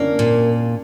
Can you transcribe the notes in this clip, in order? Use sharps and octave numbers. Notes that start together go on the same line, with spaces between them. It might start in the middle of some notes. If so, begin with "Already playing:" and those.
Already playing: A#3 C#4 D4
A#2